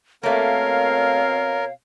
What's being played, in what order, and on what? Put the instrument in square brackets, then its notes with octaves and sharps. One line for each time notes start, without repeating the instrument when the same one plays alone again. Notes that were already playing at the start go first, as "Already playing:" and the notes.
[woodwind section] B2 C4 F5 [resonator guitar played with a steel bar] A3 A#3 [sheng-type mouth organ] A#4 [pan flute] C#5